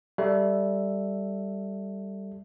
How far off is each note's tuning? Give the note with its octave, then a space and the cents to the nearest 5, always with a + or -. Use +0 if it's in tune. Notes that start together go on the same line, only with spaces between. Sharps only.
G3 +0 A4 +10 E5 +0